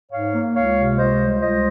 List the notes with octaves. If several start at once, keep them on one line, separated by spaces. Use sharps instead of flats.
G#2 C#5 F5
A#3
C#2 C#5 F5
C3
C#2 C5 D#5
G3
C#2 C5 D#5